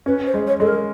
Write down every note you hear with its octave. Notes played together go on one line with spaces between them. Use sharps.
C#4 B4
C5
G#3
C#5
G#3 A4
A#4